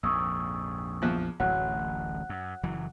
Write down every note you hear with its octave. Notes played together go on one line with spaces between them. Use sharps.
A#1 F2 G#2 C#6 D#6 E6
E2 F3 F#6
D1 A1 F#3 F#5 F#6
F#2
F#1 E3 F#3